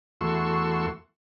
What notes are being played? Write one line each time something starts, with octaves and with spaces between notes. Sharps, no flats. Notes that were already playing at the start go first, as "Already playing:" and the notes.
E2 A3 F#4 C6 C#6 E6